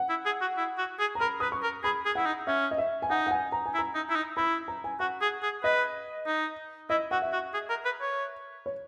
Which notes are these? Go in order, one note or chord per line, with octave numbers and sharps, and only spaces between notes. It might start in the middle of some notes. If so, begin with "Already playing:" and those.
Already playing: F#5
E4
G#4
F#4
E4
F#4
G#4
A#5
A#4 B5
B4 D#6
C#6
A#4
G#4 B5
G#4
E4 F#5
D#4
C#4 E5
D#5
E5
G#5
D#4 F#5
F#5
G#5
A#5
G#5
E4
A#5
D#4
E4
D#4
E4 B5
A#5
G#5
F#4 F#5
G#4
G#4
B4 D#5
D#4
E4 D#5
F#4 F#5
E5
F#4
G#4
A#4
B4
C#5
C#5